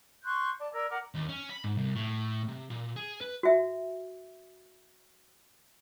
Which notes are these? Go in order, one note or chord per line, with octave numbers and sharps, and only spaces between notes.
C6 C#6 F#6 G6
D5 A5
A#4 D5 E6 G#6
A#4 F#5 D6 F6
D#2
C#4
B5
G#2
C2
A2
C3
A#2
G#4
B4
F#4 E5